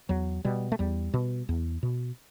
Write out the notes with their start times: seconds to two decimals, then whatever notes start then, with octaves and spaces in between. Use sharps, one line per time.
0.09 E2 F#3
0.45 B2 G3
0.72 A3
0.79 E2 G3
1.14 B2
1.49 E2
1.83 B2